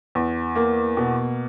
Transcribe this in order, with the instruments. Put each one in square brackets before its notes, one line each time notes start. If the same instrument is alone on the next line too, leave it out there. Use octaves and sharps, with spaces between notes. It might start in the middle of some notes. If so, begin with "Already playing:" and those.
[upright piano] E2
A#3
B2